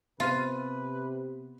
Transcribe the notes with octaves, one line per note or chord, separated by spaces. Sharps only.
C3 B3 F4 B4 C5 D#7